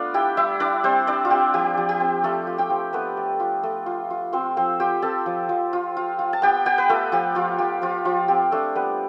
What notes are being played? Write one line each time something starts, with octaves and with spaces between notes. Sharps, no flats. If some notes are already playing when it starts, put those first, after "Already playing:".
Already playing: A3 B3 D4 F4 B4 D5
E4 G4 G5
G3 E4 E5
D4 E4 D5
G3 C4 C5
D4 E4 D5
F4
C4 G4
F3 G4
F3
G4
C4
A3 F4 A4
F4
G4 G5
F3
A3 B3 B4
A3
F4
A3
F4
F4
C4 F4 C5
F3 C4 C5
F4 G4 G5
C4 A4 A5
F3
F3
F4
F4
F4
A5
B3 G4 G5
B3 G4 G5
B4
A3 F4 A4
F3 G4
F3 F4
F3 G4
F3 F4
F3 F4
C4 G4
A3 D4 A4
G3 B3 B4